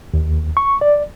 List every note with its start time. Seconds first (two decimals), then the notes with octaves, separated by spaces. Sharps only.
0.14 D#2
0.57 C#6
0.81 D5